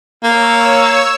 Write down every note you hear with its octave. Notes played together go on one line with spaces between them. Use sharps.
A#3 C#5 E6